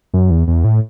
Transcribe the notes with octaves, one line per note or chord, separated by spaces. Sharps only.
F#2
E2
E2
A2